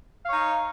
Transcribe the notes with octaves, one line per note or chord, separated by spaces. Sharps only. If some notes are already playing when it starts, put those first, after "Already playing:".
D#4 C#5 F5